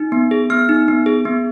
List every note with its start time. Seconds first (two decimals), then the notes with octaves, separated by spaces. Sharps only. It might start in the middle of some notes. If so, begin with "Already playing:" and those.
Already playing: D#4
0.12 B3
0.31 G#4
0.50 B3 F6
0.69 D#4
0.88 B3
1.06 G#4
1.25 B3